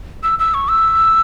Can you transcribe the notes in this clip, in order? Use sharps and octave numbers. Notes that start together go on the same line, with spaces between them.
E6
E6
C#6
E6